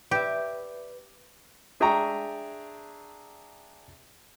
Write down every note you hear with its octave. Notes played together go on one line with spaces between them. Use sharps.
G4 B4 D5 E5
D4 G#4 E5 G5 A#5 C#6